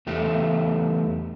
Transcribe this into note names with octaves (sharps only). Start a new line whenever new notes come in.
E2 A3 G4